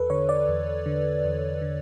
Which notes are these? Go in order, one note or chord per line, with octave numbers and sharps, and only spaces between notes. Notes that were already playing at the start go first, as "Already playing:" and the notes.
Already playing: E2 A4 B4
D3 C#5
D5
E2
D3
E2
D3